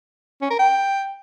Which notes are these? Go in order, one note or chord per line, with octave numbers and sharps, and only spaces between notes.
C#4
A#4
G5